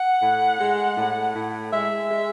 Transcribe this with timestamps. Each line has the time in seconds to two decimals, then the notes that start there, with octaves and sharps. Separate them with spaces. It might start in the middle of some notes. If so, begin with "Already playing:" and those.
Already playing: F#5
0.22 A2
0.60 G#3
0.98 A2
1.35 A2
1.73 G#3 E5
2.11 G#3